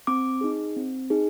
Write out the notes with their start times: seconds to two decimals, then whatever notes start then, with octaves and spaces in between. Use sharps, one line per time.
0.07 C4 D6
0.41 D#4 G#4
0.76 C4
1.10 D#4 G#4